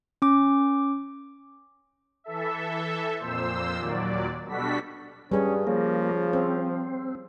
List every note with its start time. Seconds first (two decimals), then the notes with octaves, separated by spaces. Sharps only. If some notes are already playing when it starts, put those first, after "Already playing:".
0.22 C#4 D6
2.24 E3 A4 E5
3.18 F2 A#2 C5 E6
3.78 D#2 A#2 F#3 D5
4.44 B2 G3 D4 F#4 A4 B6
5.31 G2 G3 C#4 G#4
5.67 C#3 F3 A#3
6.33 C4 C5